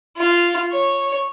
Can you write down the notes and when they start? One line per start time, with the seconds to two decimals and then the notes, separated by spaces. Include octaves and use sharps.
0.17 F4
0.72 C#5